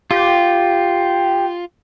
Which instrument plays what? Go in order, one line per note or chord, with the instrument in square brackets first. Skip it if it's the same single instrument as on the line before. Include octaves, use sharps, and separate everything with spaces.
[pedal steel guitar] F4 [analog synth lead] G4